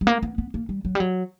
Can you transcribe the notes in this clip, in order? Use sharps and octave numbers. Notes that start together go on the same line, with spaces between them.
G3
A#3
B3
B3
A#3
G3
F#3
G3
F#3